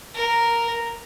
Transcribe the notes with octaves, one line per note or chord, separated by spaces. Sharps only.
A#4